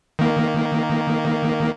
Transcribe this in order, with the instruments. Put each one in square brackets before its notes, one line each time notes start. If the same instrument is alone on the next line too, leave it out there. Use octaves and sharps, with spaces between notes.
[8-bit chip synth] D#3 A#3